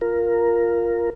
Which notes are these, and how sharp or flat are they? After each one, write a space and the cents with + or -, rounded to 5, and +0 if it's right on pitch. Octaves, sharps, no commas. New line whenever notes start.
F4 +0 A#4 +0